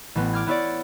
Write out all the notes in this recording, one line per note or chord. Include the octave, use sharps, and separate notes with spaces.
A1 B3
D6 F6 G#6
B3 E4 C#5 D5